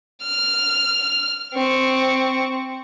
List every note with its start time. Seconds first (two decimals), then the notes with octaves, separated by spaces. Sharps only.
0.23 F6
1.54 C4 C#6